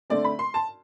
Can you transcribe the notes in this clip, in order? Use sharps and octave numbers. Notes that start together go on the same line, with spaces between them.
D3 A3 C4 D5
B5
C6
A5